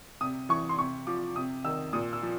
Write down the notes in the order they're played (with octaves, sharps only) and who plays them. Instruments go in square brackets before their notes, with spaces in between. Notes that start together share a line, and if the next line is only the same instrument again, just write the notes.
[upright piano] C3 D#6
E3 C#6
C6
C3 C#6
F3 D6
C3 D#6
D#3 E6
A#2 D#6
E6
F3